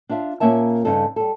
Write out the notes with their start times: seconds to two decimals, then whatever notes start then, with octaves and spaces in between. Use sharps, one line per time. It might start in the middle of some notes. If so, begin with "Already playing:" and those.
0.09 D4 F4 E5 F5
0.40 A#2 F3 A#3 C#4 E5 A5
0.85 G2 C#3 D#4 A4
1.16 G3 A4